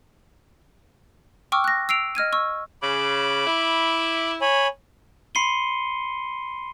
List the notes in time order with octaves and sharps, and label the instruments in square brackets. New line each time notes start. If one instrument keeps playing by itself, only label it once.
[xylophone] G5 C#6 D6 E6 F6
F#6 A#6
E6 C7 D7 F7
D#5 F6 G#6 D#7
C#6 E6
[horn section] C#3 [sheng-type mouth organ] B5 D6
[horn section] E4
[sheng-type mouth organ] C#5 G#5 B5
[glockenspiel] B5 C6 C7 C#7 D#7 G7